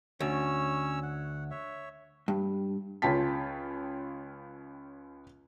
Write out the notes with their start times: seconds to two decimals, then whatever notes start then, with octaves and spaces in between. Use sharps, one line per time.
0.20 D2 C#4 C#5 E6
1.03 F#5
1.51 C#5 E5
2.28 G2
3.02 C#2 C#4 F4 G5 A5 B6